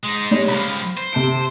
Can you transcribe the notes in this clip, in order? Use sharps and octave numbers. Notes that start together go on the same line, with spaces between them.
G#3 D#4
G3 C#5
C#2 F3 B5
C5
C3 A5 D7